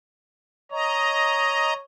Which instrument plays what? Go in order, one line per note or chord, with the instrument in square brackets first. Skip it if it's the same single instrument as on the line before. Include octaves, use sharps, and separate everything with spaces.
[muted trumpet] C#5 [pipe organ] D#5 A#5